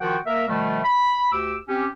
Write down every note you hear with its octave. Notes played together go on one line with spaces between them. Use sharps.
D#3 F3 F4 F#4 F#5 G5
A#3 A#4 E5
B2 D#3 F3 G3 A3
B5
D2 G4 D6 E6
C4 C#4 G4